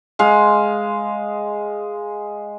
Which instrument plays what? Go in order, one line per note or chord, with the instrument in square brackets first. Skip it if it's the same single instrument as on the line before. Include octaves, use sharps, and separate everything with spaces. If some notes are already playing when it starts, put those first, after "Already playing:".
[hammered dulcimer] G#3 F5